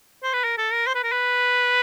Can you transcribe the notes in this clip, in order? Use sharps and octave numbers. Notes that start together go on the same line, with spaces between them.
C5
B4
A#4
A4
A#4
C5
B4
A#4
B4